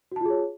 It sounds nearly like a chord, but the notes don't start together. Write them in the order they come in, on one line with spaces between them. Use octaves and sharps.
F#4 A5 F4 G#4 C#5